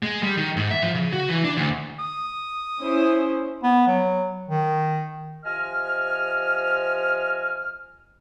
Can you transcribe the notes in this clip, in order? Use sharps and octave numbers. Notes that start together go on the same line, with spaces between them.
G#3
G3
D#3
G#2
E5
F3
C#3
F#4
E3
D4
D2
D#6
C#4 E4 C5
B3
F#3
D#3
C3 F3 D#5 G#5 F6